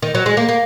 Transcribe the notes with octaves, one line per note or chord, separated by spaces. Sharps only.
D#3
F#3
G#3
A#3
A#3